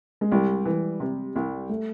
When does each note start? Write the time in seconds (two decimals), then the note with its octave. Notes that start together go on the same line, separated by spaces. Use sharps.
0.21 G#3
0.31 C2 G3
0.65 E3
1.00 C3
1.36 C2
1.69 A3